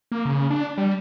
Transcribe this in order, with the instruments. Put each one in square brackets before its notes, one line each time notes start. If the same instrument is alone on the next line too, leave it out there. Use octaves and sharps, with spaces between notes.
[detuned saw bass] A#3
C#3
D4
G3